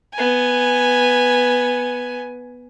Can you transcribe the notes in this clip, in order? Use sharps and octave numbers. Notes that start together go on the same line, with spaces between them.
B3 G#5